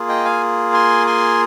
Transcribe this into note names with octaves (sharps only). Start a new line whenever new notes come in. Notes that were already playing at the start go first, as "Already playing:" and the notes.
Already playing: A#3 F4 G#4
D#5 G5
F5 G#5
G#5 C6
G#5 C6